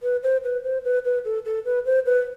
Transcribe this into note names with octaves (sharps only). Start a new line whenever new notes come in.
B4
C5
B4
C5
B4
B4
A4
A4
B4
C5
B4